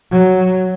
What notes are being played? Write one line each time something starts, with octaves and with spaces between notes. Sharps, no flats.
F#3